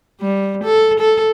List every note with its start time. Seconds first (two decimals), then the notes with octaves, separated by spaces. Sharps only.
0.21 G3
0.63 A4
1.00 A4